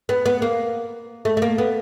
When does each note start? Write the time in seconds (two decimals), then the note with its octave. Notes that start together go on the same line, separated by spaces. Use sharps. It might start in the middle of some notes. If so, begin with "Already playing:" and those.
0.09 B3
0.26 B3
0.42 A#3
1.25 A3
1.37 A3
1.42 A#3
1.58 B3